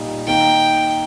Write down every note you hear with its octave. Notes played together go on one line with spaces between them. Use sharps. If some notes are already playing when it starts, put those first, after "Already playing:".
Already playing: A#2 G3 D#4
D#3 A#3 D#4 G5